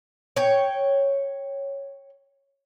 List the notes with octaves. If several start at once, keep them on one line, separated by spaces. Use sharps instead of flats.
C#5 G5